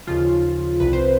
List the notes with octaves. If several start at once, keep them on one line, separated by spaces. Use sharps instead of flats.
D#2 C#3 F3 F4
C2 C3 F3 B4
C5